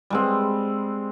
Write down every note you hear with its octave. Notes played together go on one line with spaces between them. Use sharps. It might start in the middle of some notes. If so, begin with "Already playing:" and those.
G3 G#3 C4